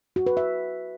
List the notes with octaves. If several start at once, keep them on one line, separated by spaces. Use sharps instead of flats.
F#4
B4
E5